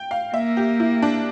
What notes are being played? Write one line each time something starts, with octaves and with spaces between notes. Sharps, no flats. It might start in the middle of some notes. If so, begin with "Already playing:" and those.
Already playing: G5
F5
A#3 E5
G4
E4
D4